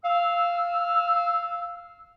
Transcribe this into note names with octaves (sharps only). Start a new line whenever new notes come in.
F5 E6